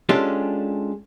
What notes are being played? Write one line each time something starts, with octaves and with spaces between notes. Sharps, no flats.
G#3 C#4 D4 F4 G4 A4